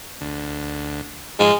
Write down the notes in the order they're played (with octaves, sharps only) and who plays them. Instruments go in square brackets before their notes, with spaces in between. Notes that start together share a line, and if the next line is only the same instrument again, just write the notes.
[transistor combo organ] D2
[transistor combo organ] G#2 F3 [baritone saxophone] G#3